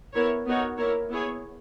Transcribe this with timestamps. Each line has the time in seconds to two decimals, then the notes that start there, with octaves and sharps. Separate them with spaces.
0.14 B3 E4 A#4 C#5
0.47 B3 D#4 F#4 A#4 C#5
0.78 A#3 E4 A#4 C#5
1.10 B3 E4 G#4 C#5